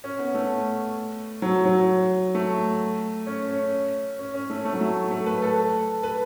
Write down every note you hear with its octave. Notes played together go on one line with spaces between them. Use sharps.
C#4
B3
A3
F#3
F#3
A3
C#4
C#4
C#4
C#4
A3
A3
F#3
A3
A3
B4
A4
B4